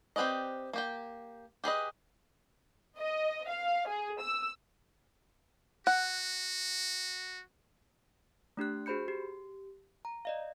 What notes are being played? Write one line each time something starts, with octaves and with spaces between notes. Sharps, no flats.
C4 G4 B4 D5 D#5
A#3 G4 G5
G4 G#4 B4 D#5
D#5
F5
G#4
E6
F#4 F#5
A3 D4 G4 F#6
F#4 G#4 C5 B5 G6 C#7
G4
A#5
D5 D#5 F5